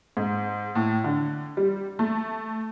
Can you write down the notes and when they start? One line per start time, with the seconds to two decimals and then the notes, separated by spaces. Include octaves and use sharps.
0.17 G#2
0.75 A2
1.04 D3
1.57 G3
1.99 A3